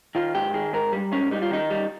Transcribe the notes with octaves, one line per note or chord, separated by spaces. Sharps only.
D#3 F4
G#2 G4
D#3 G#4
G#2 A#4
G3
G#2 C#4
G3 D#4
F4
D#3 D#4
G3